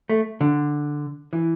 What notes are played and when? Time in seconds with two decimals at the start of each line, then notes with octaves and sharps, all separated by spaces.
0.09 A3
0.41 D3
1.33 E3